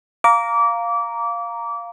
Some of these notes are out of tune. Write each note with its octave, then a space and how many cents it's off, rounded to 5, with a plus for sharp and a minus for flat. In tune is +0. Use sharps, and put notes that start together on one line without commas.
F5 +0 A#5 +0 D6 -25